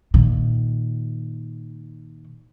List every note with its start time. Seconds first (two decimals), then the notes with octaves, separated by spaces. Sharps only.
0.14 A#2 D#3